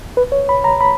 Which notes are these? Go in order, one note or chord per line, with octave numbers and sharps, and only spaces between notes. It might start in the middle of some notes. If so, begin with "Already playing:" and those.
B4
C#5
B5
A#5
B5